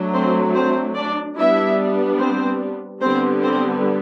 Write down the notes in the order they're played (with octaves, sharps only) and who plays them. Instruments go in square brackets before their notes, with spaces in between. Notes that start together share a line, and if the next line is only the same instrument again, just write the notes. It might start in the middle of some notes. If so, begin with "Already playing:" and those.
Already playing: [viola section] F#3 A3 D4
C4 C5
C4 C5
D4 D5
G3 B3 D4 E4 E5
C4 C5
D3 G3 B3 C4 C5
C4 C5